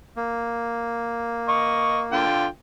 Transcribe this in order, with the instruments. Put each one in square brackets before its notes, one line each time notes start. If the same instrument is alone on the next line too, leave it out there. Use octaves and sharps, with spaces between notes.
[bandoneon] A#3
[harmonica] D#5 C#6
D3 F4 G5